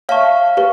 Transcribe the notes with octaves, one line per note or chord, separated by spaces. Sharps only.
C#5 E5 F5 A5 C#6
G4 B4